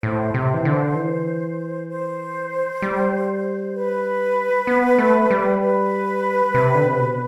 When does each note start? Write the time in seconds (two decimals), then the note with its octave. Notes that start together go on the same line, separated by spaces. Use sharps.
0.02 A2 C5
0.34 C3
0.54 E3
0.65 D3
0.95 E3
1.89 C5
2.82 G3
3.75 B4
4.67 B3
4.98 A3
5.31 G3
5.61 B4
6.54 C3
6.75 D3
6.87 C3
7.00 B2